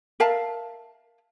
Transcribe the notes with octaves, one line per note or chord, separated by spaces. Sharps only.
A#4 E5 F5 A5